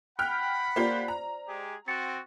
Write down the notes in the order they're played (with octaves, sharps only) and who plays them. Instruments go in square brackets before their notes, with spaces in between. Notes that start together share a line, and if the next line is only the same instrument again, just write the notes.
[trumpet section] F#5 B5 [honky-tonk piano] G5 F6 [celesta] F#6
[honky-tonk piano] A#3 F4 G4 [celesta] C5 D5
[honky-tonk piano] A#5
[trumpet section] G#3 G4 G#4
[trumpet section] C4 F#4 [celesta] A6 C#7